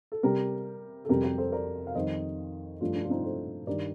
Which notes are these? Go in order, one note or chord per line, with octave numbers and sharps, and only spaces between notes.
A4
C3 G3 G4 A#4
A4
F2 C3 G3 G4 A#4
G4 A#4
A4 C5
A#4 D5
F5
F2 D#3 G3 C5 D#5
G2 F3 A3 D4 F4
D4
F4
C4 D#4
A4 C5
G2 D#3 G3 A#4 D5